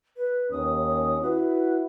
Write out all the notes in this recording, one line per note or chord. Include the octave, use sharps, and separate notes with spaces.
B4
D#2 C#4 D#6
E4 F#4 B4